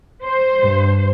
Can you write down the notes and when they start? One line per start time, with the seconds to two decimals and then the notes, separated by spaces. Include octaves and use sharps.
0.24 C5
0.60 G2